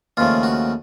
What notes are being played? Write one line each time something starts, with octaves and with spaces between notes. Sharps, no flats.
D#2 C#3 F3 A3 F4
F#4